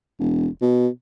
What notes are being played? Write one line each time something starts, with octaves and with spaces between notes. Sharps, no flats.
E1
B2